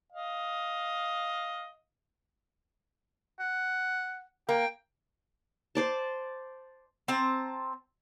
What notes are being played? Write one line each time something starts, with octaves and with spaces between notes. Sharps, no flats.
D#5 F5
F#5
A#3 G5
C5 D5 A5
C4 A5 A#5